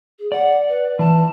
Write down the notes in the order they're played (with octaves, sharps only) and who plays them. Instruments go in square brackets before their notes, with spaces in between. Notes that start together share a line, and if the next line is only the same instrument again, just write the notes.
[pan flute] G#4
[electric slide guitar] D5 [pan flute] F#5
[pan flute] B4
[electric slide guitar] E3 [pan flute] A5